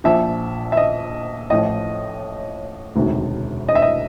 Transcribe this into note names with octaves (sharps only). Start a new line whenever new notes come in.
A#1 A#2 F3 E5
E5
D#5
A1 A2 F3 D#5
E1 D2 C3 D#3
D#5
E5
D#5